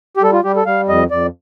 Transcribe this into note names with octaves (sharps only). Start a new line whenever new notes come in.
G4
G3 A4
F4
G3 G4
A4
G3 F5
F2 D#5
F2 D5